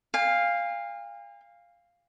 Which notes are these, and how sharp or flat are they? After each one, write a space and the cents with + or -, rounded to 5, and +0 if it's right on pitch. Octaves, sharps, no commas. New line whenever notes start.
F5 +0 G#5 -45